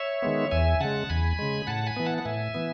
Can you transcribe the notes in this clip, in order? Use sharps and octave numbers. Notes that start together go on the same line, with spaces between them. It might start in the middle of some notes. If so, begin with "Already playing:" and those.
Already playing: C#5 E5
D#3 G#3 B3
E2 E5 G#5
C#3 G#3 F#5 A5
E2 G#5 B5
C#3 G#3
A2 F#5 A5
G#5 B5
E3 B3
F#5 A5
F#5
A2 E5 G#5
E3 B3